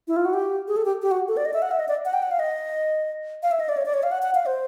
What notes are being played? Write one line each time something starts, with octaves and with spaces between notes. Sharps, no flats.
E4
F4
F#4
G4
G#4
A4
G4
G4
F#4
A4
D5
D#5
E5
F#5
E5
D#5
D5
F#5
G5
F#5
F5
D#5
F5
E5
D#5
D5
C#5
D5
C#5
F5
F#5
F#5
F5
C5